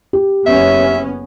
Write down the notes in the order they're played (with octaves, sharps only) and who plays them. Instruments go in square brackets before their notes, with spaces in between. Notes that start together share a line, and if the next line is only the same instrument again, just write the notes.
[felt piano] G4
[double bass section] F#1 B3 C#4 [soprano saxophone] E5